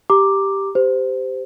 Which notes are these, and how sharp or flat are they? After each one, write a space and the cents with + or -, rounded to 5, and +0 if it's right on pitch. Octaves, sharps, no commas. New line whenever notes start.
G4 +0 A#5 +0 D6 +5
G4 +0 C5 -25